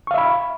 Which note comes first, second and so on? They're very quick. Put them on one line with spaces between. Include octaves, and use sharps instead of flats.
C#6 F5 E5 B5